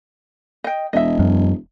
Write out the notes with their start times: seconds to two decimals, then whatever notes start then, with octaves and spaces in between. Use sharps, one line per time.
0.64 D#5 G5
0.93 E1 D#5 E5
1.19 F#2